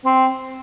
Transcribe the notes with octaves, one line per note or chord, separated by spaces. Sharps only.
C4